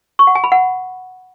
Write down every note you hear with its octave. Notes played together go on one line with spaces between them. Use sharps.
C#6
F#5
G#5
B5
F#5